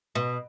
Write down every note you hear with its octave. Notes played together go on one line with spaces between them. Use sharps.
B2